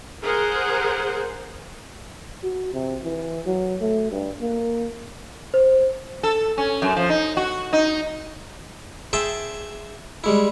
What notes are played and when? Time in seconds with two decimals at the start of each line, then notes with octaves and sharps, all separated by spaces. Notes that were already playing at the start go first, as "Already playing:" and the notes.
0.23 G#4 A#4 C5 F#5
2.44 F#4
2.74 C3
3.03 E3
3.46 F#3
3.80 A3
4.12 G2
4.41 A#3
5.54 C5
6.23 A4
6.58 C#4
6.82 F#2
6.96 F3
7.09 D#4
7.37 F#4
7.73 D#4
9.13 G#4 C5 E5 G5 A5
10.24 G3 G#3 E4